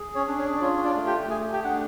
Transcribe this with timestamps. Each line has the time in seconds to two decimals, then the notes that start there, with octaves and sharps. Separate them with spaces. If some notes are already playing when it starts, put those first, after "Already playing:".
Already playing: G#4
0.15 C#4 C#5
0.27 D4
0.38 C#4 C#5
0.57 D5
0.61 C#4 F4 C#5
0.85 D4 D5
0.96 A3
1.07 G4 G5
1.30 A3 G#4 G#5
1.53 G4 G5
1.64 D4 F#5